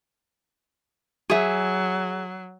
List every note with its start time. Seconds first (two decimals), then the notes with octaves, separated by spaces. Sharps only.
1.30 F#3 G#4 E5